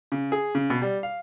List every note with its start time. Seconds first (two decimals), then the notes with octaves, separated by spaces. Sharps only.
0.12 C#3
0.32 G#4
0.55 C#3
0.70 B2
0.82 G3
1.03 F5